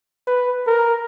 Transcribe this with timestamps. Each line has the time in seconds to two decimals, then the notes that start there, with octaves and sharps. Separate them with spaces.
0.27 B4
0.67 A#4